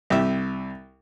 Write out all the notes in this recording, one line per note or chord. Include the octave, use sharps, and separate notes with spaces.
C2 G4 E5